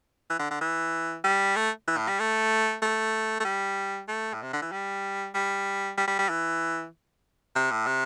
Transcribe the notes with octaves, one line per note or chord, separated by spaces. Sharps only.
E3
D3
D3
E3
G3
A3
E3
A2
G3
A3
A3
A3
G3
A3
A2
C3
D3
E3
G3
G3
G3
G3
G3
E3
C3
A2
C3